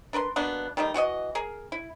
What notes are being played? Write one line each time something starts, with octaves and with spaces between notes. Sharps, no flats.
D4 A#4 B4 C6
B2 A#3 B3 D4
D#3 G3 A3 D#4
E3 F#4 C#5 D#5
G#4 A#4
E4